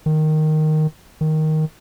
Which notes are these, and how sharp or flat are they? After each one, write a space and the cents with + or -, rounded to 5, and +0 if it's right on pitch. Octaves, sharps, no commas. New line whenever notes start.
D#3 -5
D#3 +5